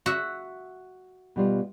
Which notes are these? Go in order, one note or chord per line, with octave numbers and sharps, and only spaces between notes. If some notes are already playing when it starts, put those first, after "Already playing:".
F#4 E5
B2 G3 F4